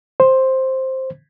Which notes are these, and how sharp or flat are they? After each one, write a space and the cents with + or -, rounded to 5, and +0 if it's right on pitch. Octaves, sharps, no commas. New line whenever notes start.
C5 +5